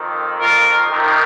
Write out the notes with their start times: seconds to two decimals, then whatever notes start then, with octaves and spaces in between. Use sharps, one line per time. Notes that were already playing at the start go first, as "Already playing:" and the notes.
Already playing: F2 D#3
0.40 F4 A#4
0.89 F2 C3 D#3